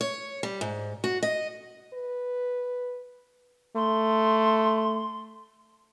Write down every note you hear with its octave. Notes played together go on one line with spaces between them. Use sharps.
C#5
G3
G#2
F#4
D#5
B4
A3 C6